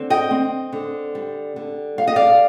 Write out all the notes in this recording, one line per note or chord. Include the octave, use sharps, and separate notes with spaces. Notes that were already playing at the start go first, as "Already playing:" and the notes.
Already playing: D3 C4
D#5 G5
C4
D3
G3
D3
G3 F5
D#5
D5 F5